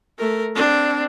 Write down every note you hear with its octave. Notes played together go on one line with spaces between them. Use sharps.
A3 A#4
C4 D4